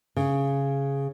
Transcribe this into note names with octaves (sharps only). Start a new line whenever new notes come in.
C#3